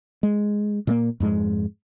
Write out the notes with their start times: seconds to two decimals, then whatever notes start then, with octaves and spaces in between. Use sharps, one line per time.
0.23 G#3
0.87 A#2 A3 A#3
1.20 F2 G#2 G#3